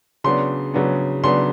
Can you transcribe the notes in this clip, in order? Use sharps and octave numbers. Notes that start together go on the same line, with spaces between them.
C#3 F#3 B3 D4 C6
C#3 F#3 B3 D4
C#3 F#3 B3 D4 C6